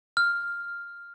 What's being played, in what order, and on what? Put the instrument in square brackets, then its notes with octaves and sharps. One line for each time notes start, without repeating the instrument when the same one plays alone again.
[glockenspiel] F6